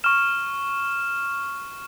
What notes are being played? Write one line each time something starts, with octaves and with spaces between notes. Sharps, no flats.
C#6 F6 E7